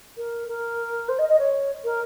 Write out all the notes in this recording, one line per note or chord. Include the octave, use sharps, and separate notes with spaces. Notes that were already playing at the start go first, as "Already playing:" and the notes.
A#4
A#4
C5
D#5
D#5
C#5
A#4